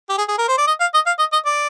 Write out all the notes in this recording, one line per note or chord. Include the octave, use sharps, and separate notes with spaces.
G4
G#4
G#4
A#4
C5
D5
D#5
F5
D#5
F5
D#5
D#5
D5